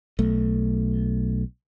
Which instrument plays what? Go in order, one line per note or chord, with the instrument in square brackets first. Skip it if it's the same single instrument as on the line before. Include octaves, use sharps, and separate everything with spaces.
[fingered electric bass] B1 A3